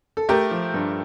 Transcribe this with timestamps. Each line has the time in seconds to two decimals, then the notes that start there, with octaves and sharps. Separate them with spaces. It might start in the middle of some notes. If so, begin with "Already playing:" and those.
0.17 A4
0.29 A3 G4 A#4
0.51 F3
0.74 G2